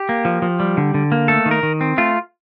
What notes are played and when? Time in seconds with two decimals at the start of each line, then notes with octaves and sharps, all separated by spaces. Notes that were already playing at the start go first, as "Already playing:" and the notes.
Already playing: G4
0.09 A#3
0.25 F3
0.42 F3
0.60 G3
0.77 D3
0.94 D3
1.12 A#3
1.28 A3 A4
1.46 D#3
1.51 A#4
1.63 D#3
1.81 C4
1.98 A3 F4